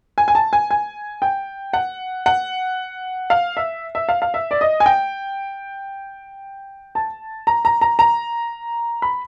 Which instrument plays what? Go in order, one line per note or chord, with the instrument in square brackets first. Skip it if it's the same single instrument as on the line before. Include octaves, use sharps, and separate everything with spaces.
[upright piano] G#5
G#5
A5
G#5
G#5
G5
F#5
F#5
F5
E5
E5
F5
F5
E5
D5
D#5
G#5
G5
A5
A#5
A#5
A#5
A#5
B5